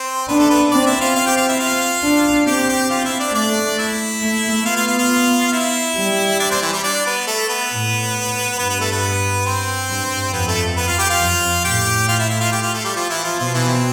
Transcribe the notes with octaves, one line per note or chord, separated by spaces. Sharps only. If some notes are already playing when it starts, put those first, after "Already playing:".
Already playing: C4 C5
B3 D4 B4
A3 A4
B3 B4
C4 D4 D5
E4 E5
F4 F5
C4 F4 F5
G4 G5
F4 F5
E4 E5
F4 F5
D4
C4 G4 G5
G4 G5
F4 F5
E4 E5
D4 D5
A3 D4 D5
E4 E5
A3
B3 F4 F5
F4 F5
F4 F5
F4 F5
F5
E4 E5
G3
D4 D5
C4 C5
E3 E4
G3 G4
D4 D5
B3 B4
A3 A4
B3 B4
A2
G2 B3 B4
B3 B4
A3 A4
B3 B4
C4 C5
G2
F2 B3 B4
A3 A4
B3 B4
F4 F5
G4 G5
F4 F5
F2
A2 G4 G5
F4 F5
E4 E5
E4 E5
F4 F5
G4 G5
F4 F5
A3 A4
G3 G4
F3 F4
E3 E4
F3 F4
B2 F3 F4
E3 E4
C4